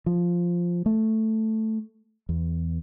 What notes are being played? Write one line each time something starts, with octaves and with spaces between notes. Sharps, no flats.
F3
A3
E2